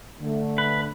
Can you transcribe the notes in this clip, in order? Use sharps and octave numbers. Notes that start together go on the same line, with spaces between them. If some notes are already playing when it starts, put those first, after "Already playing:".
D3 A3
B4